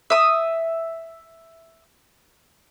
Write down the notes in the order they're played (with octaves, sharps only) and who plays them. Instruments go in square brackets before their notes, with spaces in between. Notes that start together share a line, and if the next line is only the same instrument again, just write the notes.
[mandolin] E5 D#6